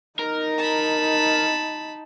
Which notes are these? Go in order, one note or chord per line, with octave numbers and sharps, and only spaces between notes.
D#4 A#4
A5 B5